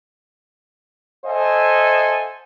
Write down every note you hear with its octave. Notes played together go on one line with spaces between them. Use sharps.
A4 C5 D#5 E5 F#5 G#5